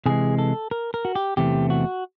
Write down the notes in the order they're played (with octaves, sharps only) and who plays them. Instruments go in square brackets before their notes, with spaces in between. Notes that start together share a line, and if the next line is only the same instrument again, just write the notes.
[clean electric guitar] C3 E3 G#3 G#4
A4
A#4
A#4
F#4
G4
E2 C3 E3 A3 C4 G4
F#4